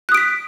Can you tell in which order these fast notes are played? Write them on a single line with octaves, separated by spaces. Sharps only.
F#6 D#6 D7 B6